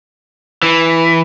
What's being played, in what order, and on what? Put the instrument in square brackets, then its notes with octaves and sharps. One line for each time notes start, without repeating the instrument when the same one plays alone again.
[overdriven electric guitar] E3